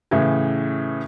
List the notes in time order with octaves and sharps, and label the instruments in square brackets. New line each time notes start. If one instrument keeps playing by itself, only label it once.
[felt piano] A2 C#3 E3